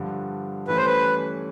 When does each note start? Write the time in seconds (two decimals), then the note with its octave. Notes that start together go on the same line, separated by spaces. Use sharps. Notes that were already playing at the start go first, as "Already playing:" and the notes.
Already playing: G2 D3 F3
0.67 G2 E3 A3 C#4 B4
0.77 C5
0.86 B4